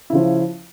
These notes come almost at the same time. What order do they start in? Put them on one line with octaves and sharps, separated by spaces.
E4 C#3 F3